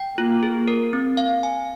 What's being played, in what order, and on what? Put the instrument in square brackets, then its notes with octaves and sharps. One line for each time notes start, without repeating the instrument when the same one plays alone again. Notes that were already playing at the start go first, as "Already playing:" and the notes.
Already playing: [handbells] G5
[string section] A#3 [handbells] F4
[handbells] G#4
A#4
C4
F5
G#5